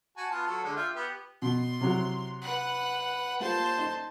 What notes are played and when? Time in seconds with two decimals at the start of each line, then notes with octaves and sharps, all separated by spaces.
0.17 F#4 G#5 A5
0.31 B3 F4 A5
0.47 F#3 A4
0.64 D3 G#3 D4
0.76 F4 E5 G5
0.95 B3 G4
1.42 B2 C6
1.81 C3 F#3 E4
2.41 B4 F#5
3.40 A#3 F4 G4 C5 A5
3.78 D#4 C6